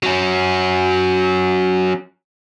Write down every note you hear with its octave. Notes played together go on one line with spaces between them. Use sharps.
F#3 C#4